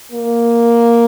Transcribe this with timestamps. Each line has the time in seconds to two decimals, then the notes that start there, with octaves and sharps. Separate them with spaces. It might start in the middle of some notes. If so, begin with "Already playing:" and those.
0.12 A#3